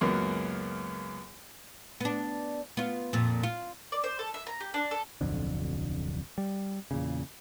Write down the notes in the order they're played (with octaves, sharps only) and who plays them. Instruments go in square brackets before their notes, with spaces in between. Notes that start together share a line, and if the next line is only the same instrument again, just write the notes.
[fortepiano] C#2 F#2 A#3 B3
[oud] B3 D4
B3 F4
F2 A#2
F4
[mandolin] D5
C5
A4
E5
A#5
G4
D4
A4
[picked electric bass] D1 B1 F2 D3
G3
E2 A#2 C#3